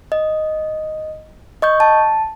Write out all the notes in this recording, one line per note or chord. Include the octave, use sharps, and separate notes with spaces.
D#5
D#5 C#6 G6
A5